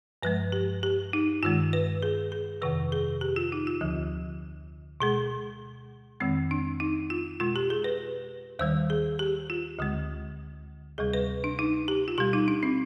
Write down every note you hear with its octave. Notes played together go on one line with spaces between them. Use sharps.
G2 F3 G#3 B4
G4
G4
D#4
G2 D#3 G#3 F4
B4
G#4
G#4
F2 C3 D#3 B4
G#4
G4
F4
D#4
F4
D2 D3 F3
B2 G#3 G#4
F2 D#3 G#3 C4
D4
D#4
F4
B2 G#3 F4
G4
G#4
B4
D#2 D#3 G3 C5
G#4
G4
F4
D2 D3 G#3
D2 C3 G3 G#4
B4
D4
D#4
G4
F4
B2 G3 G4
D#4
D4
C4